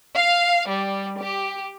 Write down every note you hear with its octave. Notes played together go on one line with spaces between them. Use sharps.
F5
G3
G4